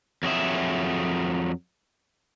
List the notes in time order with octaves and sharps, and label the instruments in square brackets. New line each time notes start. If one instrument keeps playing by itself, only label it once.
[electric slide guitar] F2 F#3 G#4 E5